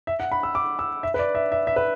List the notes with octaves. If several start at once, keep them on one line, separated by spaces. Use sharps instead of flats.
E5
F#5
B5
E6
D6
E6
E5
B4
D5
E5
E5
E5
B4